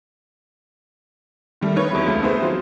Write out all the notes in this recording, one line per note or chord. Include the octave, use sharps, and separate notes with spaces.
D#3 G3 A3
D#4 B4 C#5
E2 F#3 E4 B5
C#2 A3
A3 B3 D#4 G#4 C5 E5
F#3 C4 F4